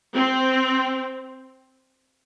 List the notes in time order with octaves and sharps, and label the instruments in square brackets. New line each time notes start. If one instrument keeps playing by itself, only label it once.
[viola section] C4